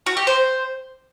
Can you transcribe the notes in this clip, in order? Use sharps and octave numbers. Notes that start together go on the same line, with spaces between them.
F#4
G4
C5